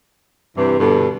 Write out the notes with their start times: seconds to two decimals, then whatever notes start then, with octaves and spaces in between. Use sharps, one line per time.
0.56 G2 C3 E3
0.79 G2 B2 D3 A4